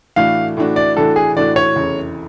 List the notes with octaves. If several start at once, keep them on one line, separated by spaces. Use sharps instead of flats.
A2 E3 A3 D4 F#4 F5
A2 E3 A3 D4 F#4
D5
A2 E3 A3 D4 F#4 A4
G#4
A2 E3 A3 D4 F#4 D5
C#5
F1 E2 C#3